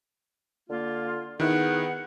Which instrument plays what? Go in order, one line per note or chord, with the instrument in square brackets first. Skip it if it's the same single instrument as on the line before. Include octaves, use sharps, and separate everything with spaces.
[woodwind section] D3 A#3 F4
[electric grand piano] D#3 E4 [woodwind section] B3 G#4 F#5